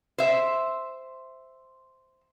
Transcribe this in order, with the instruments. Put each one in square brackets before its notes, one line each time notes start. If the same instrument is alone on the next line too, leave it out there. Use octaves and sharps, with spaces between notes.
[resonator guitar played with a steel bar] C5 E5